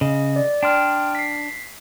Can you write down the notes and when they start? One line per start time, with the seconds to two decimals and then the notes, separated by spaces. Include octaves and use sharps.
0.01 C#3 D#5
0.36 D5
0.63 D4 G5 C6 F6
1.15 B6 C7